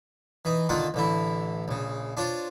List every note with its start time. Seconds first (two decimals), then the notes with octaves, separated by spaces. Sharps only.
0.45 E3 D#4
0.69 D3 D#3 A#3 F4 F#5
0.94 A1 D3 E4
1.68 A#1 C#3
2.17 D4 F4 C5 C#5